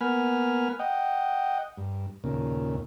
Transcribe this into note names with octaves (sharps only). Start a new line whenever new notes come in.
A#3 B3 F#5 G#5 B5 F6
D#5 F#5 G5
G2
D#2 A#2 C#3